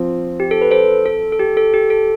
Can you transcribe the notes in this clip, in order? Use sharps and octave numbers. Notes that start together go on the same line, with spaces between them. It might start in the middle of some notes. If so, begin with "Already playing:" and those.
Already playing: F3 C4
G4
A4
B4
A4 C5
A4
A4
G4
A4
G4
A4